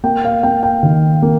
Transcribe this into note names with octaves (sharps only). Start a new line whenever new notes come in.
A#3 G5
F5
A#3 G5
G5
D#3
A#3